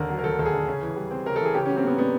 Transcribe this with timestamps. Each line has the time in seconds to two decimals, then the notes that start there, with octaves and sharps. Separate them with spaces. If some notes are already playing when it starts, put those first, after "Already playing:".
Already playing: D#2 D3 A#4
0.10 F#3
0.18 A#4
0.24 D#2 A4
0.39 D#2 A4
0.45 G#4
0.53 D3
0.68 C#3
0.82 E3
0.96 G3
1.11 C4
1.26 C#3 A#4
1.36 A4
1.40 E3 G#4
1.54 C#3 G4
1.65 F#3 C#4
1.76 C4
1.83 A#3 B3
1.98 B3 D4